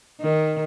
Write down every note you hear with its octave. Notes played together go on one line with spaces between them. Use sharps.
D#3